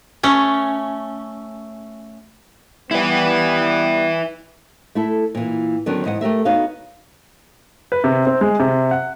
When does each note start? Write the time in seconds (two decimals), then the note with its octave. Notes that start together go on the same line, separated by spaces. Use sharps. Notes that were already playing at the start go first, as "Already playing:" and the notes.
0.23 A3 C#4
2.91 G3 B3 E4 B4
4.95 A3 E4 A4
5.35 A#2 E3
5.86 D3 D#3 F#3 B3 C#4 D4
6.04 E2 G#2 D#5 F#5
6.21 A3 G4 A#4 E5
6.45 B3 D#4 F#4 C#5 F5
7.92 B4
8.04 C3
8.26 C4
8.41 G#3
8.59 C3
8.91 F#5